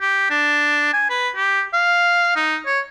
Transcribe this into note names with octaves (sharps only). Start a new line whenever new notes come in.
G4
D4
G#5
B4
G4
F5
D#4
C#5